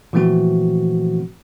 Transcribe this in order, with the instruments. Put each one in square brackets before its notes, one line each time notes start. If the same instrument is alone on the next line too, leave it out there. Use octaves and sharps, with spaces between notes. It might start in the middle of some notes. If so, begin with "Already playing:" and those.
[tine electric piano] A#2 E3 F3 A3 C4 F#4